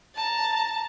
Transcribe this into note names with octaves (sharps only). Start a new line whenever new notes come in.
A5 A#5